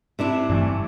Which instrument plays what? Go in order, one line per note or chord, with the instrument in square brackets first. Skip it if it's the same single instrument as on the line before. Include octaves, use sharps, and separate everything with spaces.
[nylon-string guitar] C3 D4 E4
[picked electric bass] G2 E3 A3